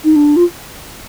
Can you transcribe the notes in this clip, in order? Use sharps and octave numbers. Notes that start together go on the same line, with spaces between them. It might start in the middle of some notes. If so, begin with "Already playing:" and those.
D#4
D4
F4